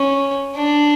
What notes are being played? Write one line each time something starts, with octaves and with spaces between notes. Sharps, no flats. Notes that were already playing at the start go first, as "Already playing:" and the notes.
Already playing: C#4
D4